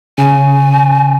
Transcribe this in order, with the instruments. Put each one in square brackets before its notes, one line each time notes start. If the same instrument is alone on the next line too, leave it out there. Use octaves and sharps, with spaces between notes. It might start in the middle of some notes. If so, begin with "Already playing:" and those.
[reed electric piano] C#3 [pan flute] G#5